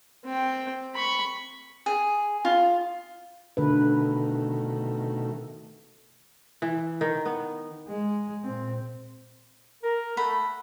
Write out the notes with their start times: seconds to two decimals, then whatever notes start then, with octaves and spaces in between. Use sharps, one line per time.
0.25 C4 G5
0.96 B5 C#6
1.86 G#4
2.45 F4
3.57 B2 D3 D#3 A3 B4
6.62 E3
7.01 D#3
7.25 B3
7.88 G#3
8.44 A#2 C4
9.83 A#4
10.17 A3 F#5 B5